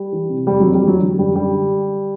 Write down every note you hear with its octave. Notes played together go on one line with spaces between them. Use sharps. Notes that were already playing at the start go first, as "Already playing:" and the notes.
Already playing: G3
E3
C3
F2 G3
F#3
F2
G3
E3 F#3
D3
F#2 G3
D3 G3